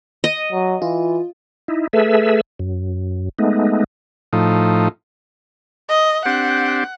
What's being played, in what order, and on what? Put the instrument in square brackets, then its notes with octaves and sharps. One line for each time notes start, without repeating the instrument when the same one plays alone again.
[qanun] D#5
[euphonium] F#3
[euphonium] E3 [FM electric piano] F4
[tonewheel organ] D#4 E4
A3 G#4 A4 B4 E5
F#2
G#3 A3 B3 D#4
[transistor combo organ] A2 F3 D#4
[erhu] D#5
[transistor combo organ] C4 D4 G4 [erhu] F#5